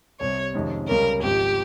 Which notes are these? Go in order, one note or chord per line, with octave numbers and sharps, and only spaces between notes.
C2 C3 G3 C#5
F2 C3 D#3 G#3 C#4
C#2 C#3 G3 C#4 A#4
G#1 G#2 F3 G4